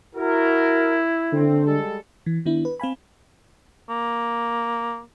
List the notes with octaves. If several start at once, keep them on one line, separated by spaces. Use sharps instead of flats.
E4 F#4 A#4
D3 A3 C4
G3 G#3 A4
E3
D#3 B3 D4 E4
B4
C4 F5 G#5 B5
A#3